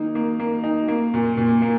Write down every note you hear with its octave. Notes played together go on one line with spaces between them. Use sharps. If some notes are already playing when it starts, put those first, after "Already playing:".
Already playing: D#3 A#3 D#4
A#3
A#3
D#4
A#3
A#2
A#2
A#3